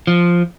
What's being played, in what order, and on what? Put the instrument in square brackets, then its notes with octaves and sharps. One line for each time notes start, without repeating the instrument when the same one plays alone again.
[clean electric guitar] F3